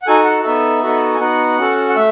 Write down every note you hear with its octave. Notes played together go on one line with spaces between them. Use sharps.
F#5
D#4 F#4 A4 G#5
F#5
B3 D#4 A4 E5
B3 D#4 F#4 A4
G#5
B3 D#4 F#4 F#5
C#4 F#4 A4
F#5
A3 E5